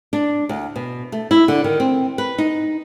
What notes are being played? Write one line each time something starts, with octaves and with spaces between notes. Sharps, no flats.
D4
D2
B2
A3
E4
D3
D#3
C4
B4
D#4